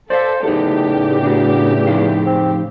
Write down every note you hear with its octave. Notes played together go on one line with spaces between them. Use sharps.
A4 C5 D5 D#5 F5
E2 A2 C#3 D#4 G4 A4
D4 F#4
F2 D#4 F5
C4